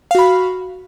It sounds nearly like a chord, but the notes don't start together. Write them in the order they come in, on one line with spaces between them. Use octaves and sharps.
F5 F#4 B5